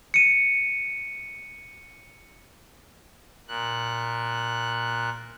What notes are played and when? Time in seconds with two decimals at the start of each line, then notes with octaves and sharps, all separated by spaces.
0.14 C#7 D#7
3.48 A#2 F#6